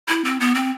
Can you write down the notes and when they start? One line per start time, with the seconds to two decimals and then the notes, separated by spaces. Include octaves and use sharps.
0.08 E4
0.24 C4
0.40 B3
0.55 C4